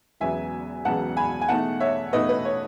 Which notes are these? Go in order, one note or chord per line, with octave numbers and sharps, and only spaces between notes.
E1 E2 C#3 F#3 B3 E5 G#5
E1 E2 C#3 F#3 B3 F#5 A5
G#5 B5
G#5
E2 B2 A3 D#4 F#5 A5
C#5 E5
E2 B2 A3 D#4 B4 D#5
B4
C#5